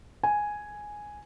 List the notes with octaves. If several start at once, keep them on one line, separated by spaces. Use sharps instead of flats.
G#5